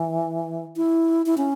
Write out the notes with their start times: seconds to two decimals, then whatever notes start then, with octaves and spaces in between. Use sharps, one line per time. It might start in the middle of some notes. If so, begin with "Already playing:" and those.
Already playing: E3
0.76 E4
1.26 E4
1.38 C#4